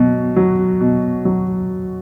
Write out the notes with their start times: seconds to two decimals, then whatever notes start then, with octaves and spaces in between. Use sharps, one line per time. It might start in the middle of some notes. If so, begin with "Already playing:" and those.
Already playing: B2 F#3
0.36 F#3
0.81 B2
1.25 F#3